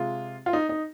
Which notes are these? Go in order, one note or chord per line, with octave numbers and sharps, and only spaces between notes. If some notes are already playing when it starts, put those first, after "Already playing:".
Already playing: C3 G#3 F4
F4
D#4
D#4